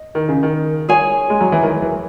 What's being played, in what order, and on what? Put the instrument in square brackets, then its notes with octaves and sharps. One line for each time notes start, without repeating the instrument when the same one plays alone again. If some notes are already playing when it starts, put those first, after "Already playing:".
Already playing: [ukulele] D#5
[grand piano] D#3
C#3
D#3
[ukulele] G#4 C#5 G#5
[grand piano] G#3
F#3
E3
D#3
E3